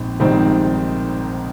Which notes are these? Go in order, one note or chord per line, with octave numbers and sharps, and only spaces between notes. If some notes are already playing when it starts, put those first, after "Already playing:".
Already playing: A#1 G#2 C4
A#1 G#2 D#3 G3 C4